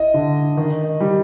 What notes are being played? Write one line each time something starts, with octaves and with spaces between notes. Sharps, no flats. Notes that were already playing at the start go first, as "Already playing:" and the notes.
Already playing: E4 D#5
D3
D#3
G3